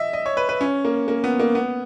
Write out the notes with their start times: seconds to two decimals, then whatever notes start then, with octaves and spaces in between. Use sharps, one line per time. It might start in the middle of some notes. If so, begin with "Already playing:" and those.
Already playing: D#5 E5
0.13 D#5
0.26 C#5
0.37 B4
0.49 B4
0.61 C#4
0.85 A#3
1.08 A#3
1.24 B3
1.40 A#3
1.55 B3